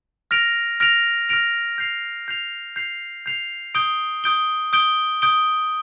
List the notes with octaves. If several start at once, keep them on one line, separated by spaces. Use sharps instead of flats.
F6 A#6 D7 F7
F6 A#6 D7 F7
F6 A#6 D7 F7
G6 C7 F7
G6 C7 F7
G6 C7 F7
G6 C7 F7
D#6 G6 D7 G7
D#6 G6 D7 G7
D#6 G6 D7 G7
D#6 G6 D7 G7